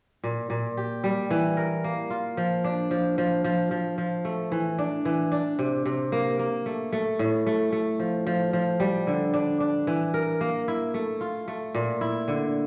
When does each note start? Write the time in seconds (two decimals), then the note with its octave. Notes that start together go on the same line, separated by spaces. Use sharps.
0.24 A#2
0.50 A#2
0.77 G4
1.04 G3
1.30 E3
1.57 A#4
1.84 A#3
2.10 F4
2.37 F3
2.64 D4
2.91 F3
3.18 F3
3.44 F3
3.71 F3
3.98 F3
4.25 A3
4.52 E3
4.79 D4
5.05 E3
5.32 D4
5.59 C3
5.86 C3
6.12 A#3
6.39 A#3
6.66 A3
6.93 A3
7.19 A2
7.46 A3
7.72 A3
8.00 F3
8.27 F3
8.53 F3
8.80 G3
9.07 D3
9.34 D4
9.60 D4
9.87 E3
10.14 A#4
10.41 A#3
10.68 E4
10.94 A3
11.21 F4
11.48 A3
11.75 A#2
12.01 E4
12.28 D3